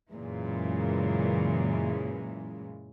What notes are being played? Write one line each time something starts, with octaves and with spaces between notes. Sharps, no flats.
F#2 A#2 C#3 E3 G#3